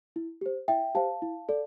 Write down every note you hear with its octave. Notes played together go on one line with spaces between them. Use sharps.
E4
G4 C5
E4 E5 G5
G4 C5 F5 A5
E4
A4 D5